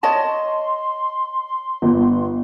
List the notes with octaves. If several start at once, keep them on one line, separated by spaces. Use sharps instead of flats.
C#5 D#5 A5 C6
G1